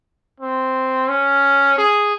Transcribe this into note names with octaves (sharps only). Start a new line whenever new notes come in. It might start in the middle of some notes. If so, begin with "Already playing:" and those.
C4
C#4
G#4